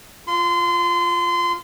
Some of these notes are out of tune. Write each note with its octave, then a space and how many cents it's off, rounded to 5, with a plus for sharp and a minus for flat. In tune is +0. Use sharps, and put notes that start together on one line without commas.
F4 +0 C6 -25